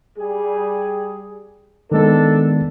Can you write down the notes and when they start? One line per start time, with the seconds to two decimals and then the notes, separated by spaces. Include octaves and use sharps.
0.18 G3 G#4
1.92 D#3 G#3 B3 D4 A4